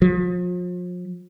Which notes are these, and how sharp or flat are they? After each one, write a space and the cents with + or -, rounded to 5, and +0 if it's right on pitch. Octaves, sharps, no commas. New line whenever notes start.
F3 +40